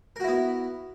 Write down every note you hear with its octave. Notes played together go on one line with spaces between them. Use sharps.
B3 E4 F#4 A#4